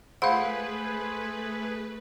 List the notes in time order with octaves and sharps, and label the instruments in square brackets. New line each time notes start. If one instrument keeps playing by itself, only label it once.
[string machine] A3 B4 [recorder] G#4 [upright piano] C5 B5 [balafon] F5 F#5